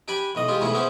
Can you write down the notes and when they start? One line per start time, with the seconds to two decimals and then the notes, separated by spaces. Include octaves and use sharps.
0.08 D4 G4 D5 G#5 B5
0.35 B1 E3 D#5
0.48 G#3 F4 G4
0.61 B1 A2 C#3 E3 E4 G#4
0.73 E3 B3 C#4 E4 G#4 C5